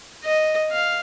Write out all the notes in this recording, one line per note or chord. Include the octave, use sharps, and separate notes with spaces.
D#5
F5